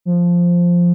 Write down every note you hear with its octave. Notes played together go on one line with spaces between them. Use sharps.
F3